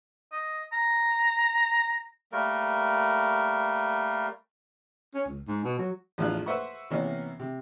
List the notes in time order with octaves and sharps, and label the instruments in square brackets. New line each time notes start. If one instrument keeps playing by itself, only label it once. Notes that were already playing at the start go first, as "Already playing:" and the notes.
[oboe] D#5
A#5
[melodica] G3 A3 A#3 A#4
[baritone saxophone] C#4
C#2
G#2
B2
F#3
[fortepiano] A1 E2 F3 D4 F4 F#6
B4 C5 E5 F#5 C6 C#6
C3 E3 A#3 B3 C#4
C3